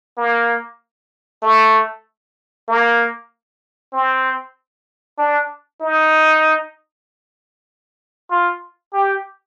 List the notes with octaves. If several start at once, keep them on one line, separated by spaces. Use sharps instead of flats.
A#3
A3
A#3
C4
D4
D#4
F4
G4